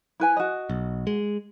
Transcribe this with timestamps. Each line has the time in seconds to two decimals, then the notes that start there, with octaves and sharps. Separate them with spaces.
0.20 E4 B4 G#5
0.37 F#4 D#5
0.70 B1
1.07 G#3